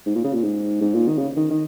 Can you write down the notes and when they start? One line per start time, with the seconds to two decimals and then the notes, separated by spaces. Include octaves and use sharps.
0.06 G#2
0.15 A#2
0.24 C#3
0.33 A#2
0.43 G#2
0.81 G#2
0.94 A#2
1.08 D#3
1.18 C#3
1.37 D#3
1.50 D#3